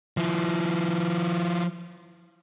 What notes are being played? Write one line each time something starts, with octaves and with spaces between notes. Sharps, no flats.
F3 E4